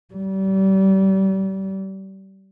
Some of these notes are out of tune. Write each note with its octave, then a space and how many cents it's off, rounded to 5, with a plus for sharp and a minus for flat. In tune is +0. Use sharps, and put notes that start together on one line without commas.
G3 -30